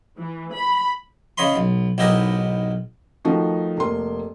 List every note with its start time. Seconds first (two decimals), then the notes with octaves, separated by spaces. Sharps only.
0.19 E3
0.55 B5
1.38 C#3 C#5 D#5 B5 C6
1.56 B1
1.98 B1 G#2 E4 G4 A#4 D#5
3.25 D#3 F3 A3 D#4 F#4
3.77 F1 A#3 C6